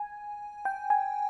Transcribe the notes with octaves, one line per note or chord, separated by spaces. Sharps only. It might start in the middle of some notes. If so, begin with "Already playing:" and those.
Already playing: G#5
G5
G#5